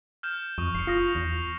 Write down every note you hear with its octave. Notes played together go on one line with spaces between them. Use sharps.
F6 G6 E7
F2 C#6 D#6
F1 C7 C#7
F4 D#6 A#6 C7
E2